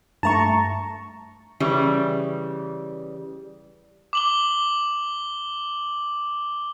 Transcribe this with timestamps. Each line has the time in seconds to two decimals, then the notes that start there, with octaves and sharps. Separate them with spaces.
0.23 G2 A3 A5 A#5 C#6
1.60 C#3 E3 G3
4.13 D6 F#7 G7